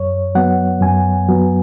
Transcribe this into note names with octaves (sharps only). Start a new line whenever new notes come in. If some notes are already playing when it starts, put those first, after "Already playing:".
Already playing: F#2 C#5
F#3 B3 F#5
F#2 G#5
F#3 B3